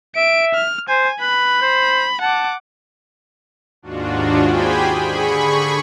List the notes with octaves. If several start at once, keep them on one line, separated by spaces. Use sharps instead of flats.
E5 D7
F6
C5 G#5
B4 B5
C5
F#5 A5 D6
D#2 G#2 D4 F4 F#4
G4 G#4 C5 G5 G#5 B5
D3 G#4 B5 C#6